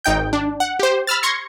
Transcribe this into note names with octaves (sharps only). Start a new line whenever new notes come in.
G#1 D#4 G5 G6
D4
F#5
G4 C5
B5 E6 F6 A6
C6 C#6 G#6 A#6 C#7